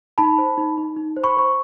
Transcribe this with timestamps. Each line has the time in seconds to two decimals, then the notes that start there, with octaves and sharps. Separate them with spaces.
0.18 D#4 A5 B5
0.38 C5
0.57 D#4
0.77 D#4
0.97 D#4
1.17 C5
1.24 B5 C#6
1.37 C5 C#6